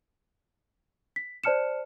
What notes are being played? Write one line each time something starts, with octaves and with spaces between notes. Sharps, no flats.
B6
C5 D5 A5 F6 C#7 E7